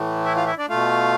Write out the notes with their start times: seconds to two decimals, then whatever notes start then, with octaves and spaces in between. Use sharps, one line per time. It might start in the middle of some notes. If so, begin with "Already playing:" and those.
Already playing: A2 E3 A3
0.25 E4 E5
0.36 F4 F5
0.47 E4 E5
0.58 D4 D5
0.69 B2 A3 F4 F5